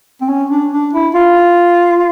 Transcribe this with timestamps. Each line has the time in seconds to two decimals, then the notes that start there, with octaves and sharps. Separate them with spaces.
0.21 C4
0.29 C#4
0.50 D4
0.72 D4
0.93 E4
1.15 F4